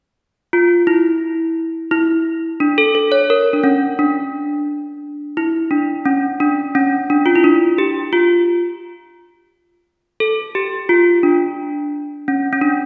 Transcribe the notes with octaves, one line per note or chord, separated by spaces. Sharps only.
F4
E4
E4
D4
A4
A4
C#5
A#4
D4
C#4
D4
E4
D4
C#4
D4
C#4
D4
F4
E4
D4
G4
F4
A4
G4
F4
D4
C#4
C#4
D4